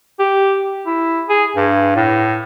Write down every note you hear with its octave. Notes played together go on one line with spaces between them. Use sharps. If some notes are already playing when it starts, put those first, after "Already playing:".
G4
E4
G#4
G2
A2